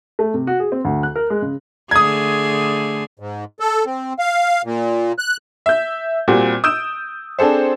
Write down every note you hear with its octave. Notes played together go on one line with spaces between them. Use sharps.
A3
C3
F#4
G#4
C4
D2
F#6
A#4
G#3
C#3
D3 A3 G#4 D#6 G#6
G#2
A4
C4
F5
A#2
F#6
E5 G6
A#2 G3 C4 F#4
D#6 E6 G6 D7 E7
C4 D4 G#4 A4 C5